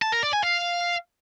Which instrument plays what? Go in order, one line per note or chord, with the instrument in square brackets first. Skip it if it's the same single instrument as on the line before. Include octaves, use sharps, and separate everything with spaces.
[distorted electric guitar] A5
A#4
D5
G#5
F5